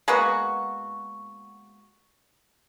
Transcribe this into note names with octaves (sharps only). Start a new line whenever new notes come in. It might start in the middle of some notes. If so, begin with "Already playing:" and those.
G#3 A#3 B3 F#4